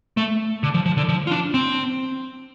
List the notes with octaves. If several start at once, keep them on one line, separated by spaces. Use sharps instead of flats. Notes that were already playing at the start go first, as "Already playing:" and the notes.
A3
D3
F3
F3
D3
F3
F4
D4
C4